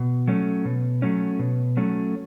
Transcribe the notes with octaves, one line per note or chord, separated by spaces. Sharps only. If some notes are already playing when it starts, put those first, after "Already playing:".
Already playing: B2
F#3 A3 C#4
B2
F#3 A3 C#4
B2
F#3 A3 C#4